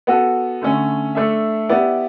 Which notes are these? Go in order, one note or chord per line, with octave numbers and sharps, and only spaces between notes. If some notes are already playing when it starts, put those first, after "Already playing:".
B3 F#4 A4
D3 A3 C#4
A3 D4 A4 E5
B3 E4 G4 D5